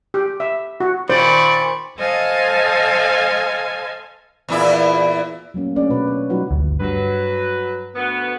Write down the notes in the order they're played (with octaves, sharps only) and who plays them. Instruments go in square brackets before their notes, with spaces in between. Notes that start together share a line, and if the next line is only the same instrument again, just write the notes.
[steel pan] G4
E5
F#4
[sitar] A#2 D#3 A#3 [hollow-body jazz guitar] C5 [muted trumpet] D5 [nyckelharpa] B5 C#6
[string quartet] A4 C5 D#5 F5 G#5 A5
[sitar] E2 A#2 E4
[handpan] F#3 A3 A#3 C#4
A3 C#4 D4 G#4 D5
B2 F#4 B4
C#5
F#3 G3 D#4 F4 F#4 B4
[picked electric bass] G1 D2
[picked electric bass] G2 [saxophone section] F#3 B4
[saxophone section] D2 A3 B3